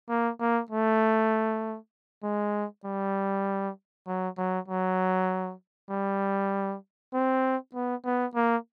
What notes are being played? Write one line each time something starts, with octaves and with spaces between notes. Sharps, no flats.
A#3
A#3
A3
G#3
G3
F#3
F#3
F#3
G3
C4
B3
B3
A#3